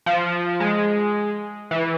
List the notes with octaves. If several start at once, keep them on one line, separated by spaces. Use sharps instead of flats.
F3
G#3
E3